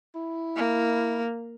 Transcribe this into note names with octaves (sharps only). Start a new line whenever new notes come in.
E4
A#3